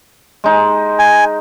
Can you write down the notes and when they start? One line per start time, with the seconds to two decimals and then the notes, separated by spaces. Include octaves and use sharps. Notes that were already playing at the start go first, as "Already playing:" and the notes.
0.44 G#3 D#4
0.99 G#5